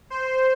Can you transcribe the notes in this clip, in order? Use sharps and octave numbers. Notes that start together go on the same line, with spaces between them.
C5